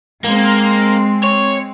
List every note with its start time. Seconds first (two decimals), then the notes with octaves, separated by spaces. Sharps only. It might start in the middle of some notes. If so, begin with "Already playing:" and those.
0.24 G#3 A#3 C4
1.23 C#5